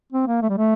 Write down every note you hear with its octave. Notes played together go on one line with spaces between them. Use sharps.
C4
A#3
A3
G3
A3